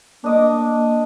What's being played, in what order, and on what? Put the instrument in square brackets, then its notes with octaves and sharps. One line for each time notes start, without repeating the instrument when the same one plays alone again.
[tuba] A#3 [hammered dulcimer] D4 D#5 D6